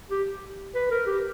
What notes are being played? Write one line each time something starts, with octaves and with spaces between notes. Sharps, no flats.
G4
B4
A#4
G4